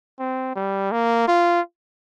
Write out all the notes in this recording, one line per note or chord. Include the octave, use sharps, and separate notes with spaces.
C4
G3
A#3
F4